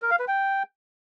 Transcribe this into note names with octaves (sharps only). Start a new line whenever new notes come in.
A#4
F5
B4
G5